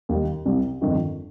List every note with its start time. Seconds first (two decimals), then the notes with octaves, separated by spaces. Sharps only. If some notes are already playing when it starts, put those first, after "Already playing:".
0.09 D#2 D#3 G3
0.45 C2 C3 G3
0.81 G1 F2 D#3